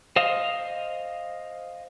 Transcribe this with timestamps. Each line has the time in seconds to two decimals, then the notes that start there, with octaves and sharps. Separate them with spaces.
0.16 C5 D#5 F5